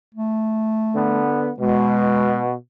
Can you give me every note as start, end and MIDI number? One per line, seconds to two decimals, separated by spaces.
0.15 1.22 57
0.95 1.51 50
0.95 1.51 59
1.59 2.53 47
1.59 2.44 56